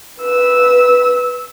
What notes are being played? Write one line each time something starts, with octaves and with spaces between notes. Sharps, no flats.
B4 E6